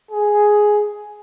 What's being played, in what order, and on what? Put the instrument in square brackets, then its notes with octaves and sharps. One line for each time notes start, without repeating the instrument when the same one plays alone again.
[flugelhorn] G#4